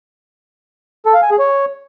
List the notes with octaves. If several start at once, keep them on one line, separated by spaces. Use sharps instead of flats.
A4
F5
G#5
G#4
C#5